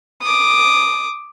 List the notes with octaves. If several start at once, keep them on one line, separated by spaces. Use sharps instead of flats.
D6 D#6